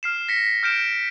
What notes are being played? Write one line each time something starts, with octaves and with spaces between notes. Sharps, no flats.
F6 C7 E7
A#6 B6 C#7
F6 G6 D7 E7